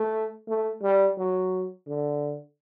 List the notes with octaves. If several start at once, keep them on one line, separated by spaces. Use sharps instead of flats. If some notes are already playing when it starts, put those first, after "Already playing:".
Already playing: A3
A3
G3
F#3
D3